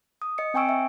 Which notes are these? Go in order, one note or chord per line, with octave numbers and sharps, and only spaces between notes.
D#6
D#5 C#7
C4 G5 G#5 C#6 E6 D7
E5